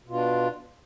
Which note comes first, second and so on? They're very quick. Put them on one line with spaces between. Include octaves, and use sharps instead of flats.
B2 F4 D4